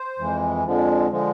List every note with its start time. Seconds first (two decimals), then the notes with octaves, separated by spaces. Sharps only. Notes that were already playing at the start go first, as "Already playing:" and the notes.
Already playing: C5
0.19 F2 E3 G#3
0.64 F2 D3 F3 G#3
1.11 D3 F3 G#3